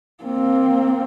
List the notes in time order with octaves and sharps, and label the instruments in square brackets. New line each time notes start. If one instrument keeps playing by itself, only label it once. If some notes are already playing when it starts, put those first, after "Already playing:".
[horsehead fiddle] A#3 C4